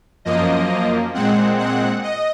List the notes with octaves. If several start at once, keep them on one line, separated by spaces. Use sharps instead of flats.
F#2 F3 A#3 D#5
A#2 G#3 C4 F#5
F#5
D#5